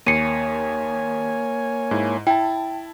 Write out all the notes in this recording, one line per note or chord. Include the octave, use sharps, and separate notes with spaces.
D#2 A#3 C#5 G#5 C7 C#7 D#7
G#2 E4
E4 G5 A5